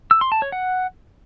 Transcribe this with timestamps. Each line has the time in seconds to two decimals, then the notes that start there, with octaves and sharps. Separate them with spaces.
0.11 E6
0.21 C6
0.32 A5
0.42 C#5
0.52 F#5